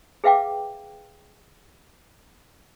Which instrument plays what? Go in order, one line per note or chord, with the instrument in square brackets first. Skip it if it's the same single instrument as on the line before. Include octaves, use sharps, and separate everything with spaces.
[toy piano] G#4 B4 E5 F5 G5 D6